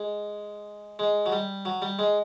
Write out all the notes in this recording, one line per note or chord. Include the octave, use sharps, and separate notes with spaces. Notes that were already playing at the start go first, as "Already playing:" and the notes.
Already playing: G#3
G#3
F#3
G3
F#3
G3
G#3